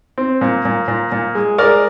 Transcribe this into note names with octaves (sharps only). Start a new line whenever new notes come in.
C4
A#2
A#2
A#2
A#2
G#3
G#3 A#4 D5